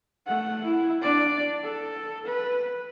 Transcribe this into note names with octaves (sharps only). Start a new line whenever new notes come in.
A3 F#5
E4
D4 D5
A4
B4